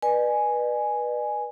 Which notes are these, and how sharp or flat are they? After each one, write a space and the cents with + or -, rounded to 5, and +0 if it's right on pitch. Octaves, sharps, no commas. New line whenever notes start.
B4 -25 D5 +45 G#5 +0